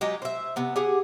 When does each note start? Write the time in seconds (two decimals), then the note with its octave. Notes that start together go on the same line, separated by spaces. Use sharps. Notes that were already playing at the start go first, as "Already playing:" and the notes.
0.01 F#3 G#3 D#4 G4
0.22 C5 E5
0.56 C3 B3
0.76 G4 G#4 F#5